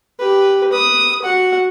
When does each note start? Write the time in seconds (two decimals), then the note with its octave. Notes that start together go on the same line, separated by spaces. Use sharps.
0.20 G4 B4
0.72 B4 D#6
1.23 F#4 F#5